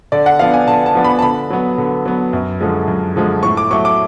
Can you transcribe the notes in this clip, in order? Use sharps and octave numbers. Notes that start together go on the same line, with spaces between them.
D3 D5
F#5
F3 B3 D4 F5
G#5
D3 A5
A5
F3 B3 D4
B5
A5
D3 B5
F#3 B3
D3
F#3 B3
F#2
D3 F3 G#3
F#2
D3 F3 G#3
A2 C#6
D6
F#3 A3 C#6
D6